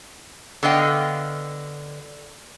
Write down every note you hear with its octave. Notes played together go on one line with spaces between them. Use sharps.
D3 B3 D#5 F5 G5